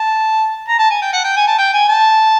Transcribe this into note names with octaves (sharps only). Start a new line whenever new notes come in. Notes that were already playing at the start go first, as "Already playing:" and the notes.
Already playing: A5
A#5
A5
G#5
G5
F#5
G5
G#5
A5
G5
G#5
A5